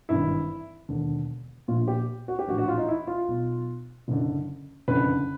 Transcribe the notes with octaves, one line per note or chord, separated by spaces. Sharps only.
G#1 G2 E3 E4
E1 D#2 D3
A#1 A#2 F4
G4
F#4
G4
A#1 A2 E3 F#4
F#4
F4
D#4
E4
F4
B1 B2
F#1 F#2 D3
F#1 F2 D3 B4